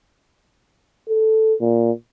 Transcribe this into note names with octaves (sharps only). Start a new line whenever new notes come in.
A4
A#2